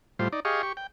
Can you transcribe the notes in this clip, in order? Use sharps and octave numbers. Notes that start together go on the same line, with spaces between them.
A2 G3 F4 C5
D#4 D5
G4 G#4 D#5 F5 C#6
G4 C#6
G5